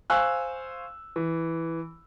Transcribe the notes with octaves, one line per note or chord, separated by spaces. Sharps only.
C5 F5 G#5 C#6 E6 F#6
E3